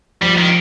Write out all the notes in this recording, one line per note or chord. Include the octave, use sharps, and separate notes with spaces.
F3 G3
D#3